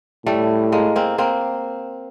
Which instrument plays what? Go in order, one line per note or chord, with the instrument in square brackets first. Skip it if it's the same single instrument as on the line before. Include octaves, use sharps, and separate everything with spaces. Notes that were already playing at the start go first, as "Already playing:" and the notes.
[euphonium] A2 [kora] G3 A3
[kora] G#3 A#3
A#3 C4
A#3 C4